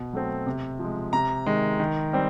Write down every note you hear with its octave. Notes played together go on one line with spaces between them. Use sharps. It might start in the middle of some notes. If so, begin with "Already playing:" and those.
Already playing: B2
F#3 A3 C4
C3
F3 G#3
C3 A#5
D#3 G#3
D#3
G3 C4